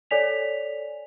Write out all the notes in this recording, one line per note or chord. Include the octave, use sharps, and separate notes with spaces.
A4 C#5 D5 G#5 B6 F7